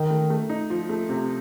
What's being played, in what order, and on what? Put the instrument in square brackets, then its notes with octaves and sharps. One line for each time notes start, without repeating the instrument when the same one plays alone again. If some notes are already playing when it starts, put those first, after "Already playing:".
Already playing: [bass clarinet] D#3 [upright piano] D#4
[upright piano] A3
A3
D#4
F3
A3
C3